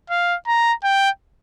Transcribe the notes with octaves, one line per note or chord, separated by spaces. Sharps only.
F5
A#5
G5